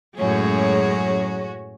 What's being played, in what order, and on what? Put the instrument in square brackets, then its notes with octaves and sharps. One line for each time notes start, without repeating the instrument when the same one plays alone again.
[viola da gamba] F#2 A2 G#4 [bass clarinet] F#3 [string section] G#3 [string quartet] C#4 F#4